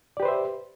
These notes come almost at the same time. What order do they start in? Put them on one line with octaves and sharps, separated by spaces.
D5 G4 B4 C5 E5